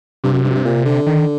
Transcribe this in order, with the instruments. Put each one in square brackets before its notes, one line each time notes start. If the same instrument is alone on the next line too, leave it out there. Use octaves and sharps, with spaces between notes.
[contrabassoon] G2 [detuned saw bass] C3
[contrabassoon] F#2
G2
F#2
G2
A#2
D3
[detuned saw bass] D#3